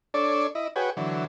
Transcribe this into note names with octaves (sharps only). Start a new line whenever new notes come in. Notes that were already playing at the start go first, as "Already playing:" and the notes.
D4 A4 C#5 D5
E4 D#5
F#4 G#4 B4 C#5 G5
D3 E3 F#3